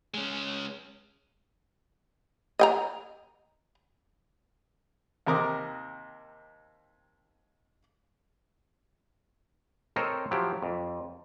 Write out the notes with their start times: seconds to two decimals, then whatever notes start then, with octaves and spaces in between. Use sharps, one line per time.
0.14 G#3 C#4
2.59 D#5 G5 A#5
5.27 D#2 C3 A#4 D6 D#6
9.96 C4 A4 A#4 C5 C#5 D#5
10.31 F3 F#3 E4 G4
10.62 F2